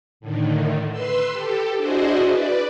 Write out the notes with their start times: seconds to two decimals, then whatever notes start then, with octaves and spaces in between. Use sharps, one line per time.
0.20 A2 D3 D#3
0.91 B4 C6 E6
1.31 G4 A4
1.77 D4 E4 F#4 G#4 C5 D#5
2.26 B4 D5